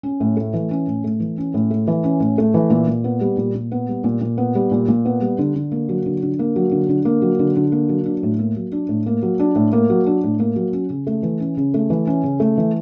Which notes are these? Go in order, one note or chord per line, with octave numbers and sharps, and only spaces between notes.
C#4
A2
A3
E3
C#4
A2
A3
E3
C#4
A2
A3
E3
C#4
A2
A3
E3
A#2
A#2
B3
G3
A#2
A#2
B3
G3
A#2
A#2
B3
G3
A#2
A#2
B3
G3
D3
D3
A#3
F#3
D3
D3
A#3
F#3
D3
D3
A#3
F#3
D3
D3
A#3
F#3
D4
A2
A#3
F#3
D4
A2
A#3
F#3
D4
A2
A#3
F#3
D4
A2
A#3
F#3
C#4
C#3
A3
E3
C#4
C#3
A3
E3
C#4
C#3
A3
E3